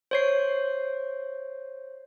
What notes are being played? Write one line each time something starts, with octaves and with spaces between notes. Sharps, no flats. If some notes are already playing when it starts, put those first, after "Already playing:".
C5 C#5 C7